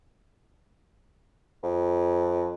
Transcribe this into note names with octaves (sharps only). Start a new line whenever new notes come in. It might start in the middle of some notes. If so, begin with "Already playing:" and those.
F2